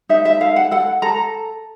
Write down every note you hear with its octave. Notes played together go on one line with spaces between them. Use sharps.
D#4 E5
E5
A4 F5
F#5
A4 F#5
A4 A#5